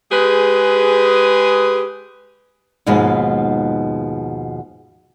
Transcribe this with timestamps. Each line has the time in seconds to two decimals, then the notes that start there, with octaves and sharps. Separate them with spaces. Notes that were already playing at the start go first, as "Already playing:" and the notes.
0.12 G#3 G4 G#4 B4
2.86 D#2 G#2 B2 F3 G#3 B3